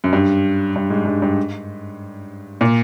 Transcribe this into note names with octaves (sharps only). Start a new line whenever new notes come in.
F#2
G2
G2
G#2
G2
G2
A#2